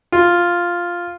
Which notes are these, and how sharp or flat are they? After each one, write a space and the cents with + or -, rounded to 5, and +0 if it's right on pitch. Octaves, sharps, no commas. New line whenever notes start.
F4 +0